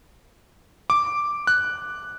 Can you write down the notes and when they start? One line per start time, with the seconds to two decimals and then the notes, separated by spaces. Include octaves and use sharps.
0.90 D6
1.47 F#6